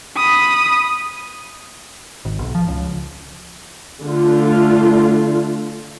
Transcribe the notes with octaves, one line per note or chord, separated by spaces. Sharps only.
B5 D#6
G#1
B1
F3
C#2
D3 A3 F4